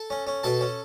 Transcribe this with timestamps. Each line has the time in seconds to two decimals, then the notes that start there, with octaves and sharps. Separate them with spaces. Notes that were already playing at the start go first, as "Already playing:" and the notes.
Already playing: A4 A5
0.10 C#4
0.27 C#4
0.43 B2 A4 A5
0.61 C#4